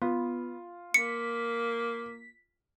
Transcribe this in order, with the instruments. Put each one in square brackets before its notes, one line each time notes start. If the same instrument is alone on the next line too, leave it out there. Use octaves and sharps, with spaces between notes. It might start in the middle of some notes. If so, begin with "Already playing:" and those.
[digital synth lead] B3 [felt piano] F4
[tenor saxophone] A#3 [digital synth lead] B6 [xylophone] C#7